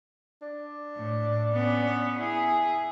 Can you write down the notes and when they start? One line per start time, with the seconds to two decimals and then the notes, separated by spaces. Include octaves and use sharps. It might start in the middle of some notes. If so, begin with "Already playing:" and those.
0.42 D4
0.97 A2
1.52 B3 C#4
2.20 E4 G#4